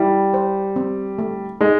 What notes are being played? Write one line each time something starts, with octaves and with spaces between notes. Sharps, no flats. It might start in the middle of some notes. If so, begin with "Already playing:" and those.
Already playing: G3 E4
C5
C4
A3
G#3 D#4